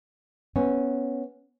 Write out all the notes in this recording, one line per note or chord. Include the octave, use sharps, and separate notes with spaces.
B3 C#4